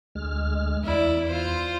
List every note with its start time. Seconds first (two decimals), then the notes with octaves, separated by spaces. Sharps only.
0.15 D2 G#3 F6
0.84 E2 E4 D5
1.27 F4 C5